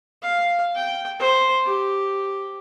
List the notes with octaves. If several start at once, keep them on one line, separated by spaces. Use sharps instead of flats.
F5
G5
C5
G4